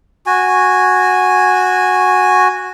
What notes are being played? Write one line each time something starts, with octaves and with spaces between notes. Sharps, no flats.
F#4 G#5